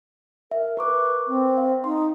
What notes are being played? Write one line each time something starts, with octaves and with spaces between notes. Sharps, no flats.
A#4 E5
A#4 B4 C#6 D6
C4
F5
D#4 C6